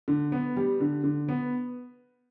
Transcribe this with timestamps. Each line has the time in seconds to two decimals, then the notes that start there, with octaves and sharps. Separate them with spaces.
0.08 D3
0.32 B3
0.57 G3
0.80 D3
1.04 D3
1.29 B3